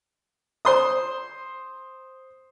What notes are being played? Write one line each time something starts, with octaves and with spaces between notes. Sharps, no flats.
C5 C6 D#6